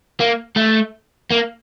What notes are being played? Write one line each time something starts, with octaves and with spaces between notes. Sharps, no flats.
A#3
A3
A#3